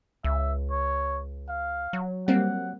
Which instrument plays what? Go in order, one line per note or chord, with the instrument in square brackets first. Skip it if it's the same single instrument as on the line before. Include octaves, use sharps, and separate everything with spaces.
[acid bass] C#2 [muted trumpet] E5
[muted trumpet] C#5
F5
[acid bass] F#3
[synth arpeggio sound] G3 A#3 C4 [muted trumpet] F#5